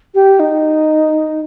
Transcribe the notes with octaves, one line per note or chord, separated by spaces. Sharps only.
G4
D#4